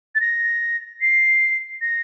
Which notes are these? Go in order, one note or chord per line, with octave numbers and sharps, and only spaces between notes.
A6
A#6
C7
A#6